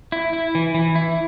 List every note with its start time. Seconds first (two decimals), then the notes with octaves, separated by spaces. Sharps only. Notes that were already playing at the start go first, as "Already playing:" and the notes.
0.12 E4
0.33 E4
0.55 E3
0.75 E3
0.95 E4